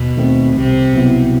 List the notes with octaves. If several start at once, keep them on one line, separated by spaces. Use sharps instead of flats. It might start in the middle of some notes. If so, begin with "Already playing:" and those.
Already playing: D#2 B2
D#3 A3 C4
C2 C3
B2 F#3 B3 E4